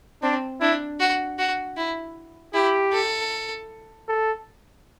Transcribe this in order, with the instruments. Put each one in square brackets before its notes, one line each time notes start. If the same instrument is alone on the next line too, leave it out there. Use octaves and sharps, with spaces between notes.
[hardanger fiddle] C4 [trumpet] D4
[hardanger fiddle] D4 [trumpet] E4
[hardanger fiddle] F#4
F#4
E4
[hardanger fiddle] E4 [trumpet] G4
[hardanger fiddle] A4
[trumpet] A4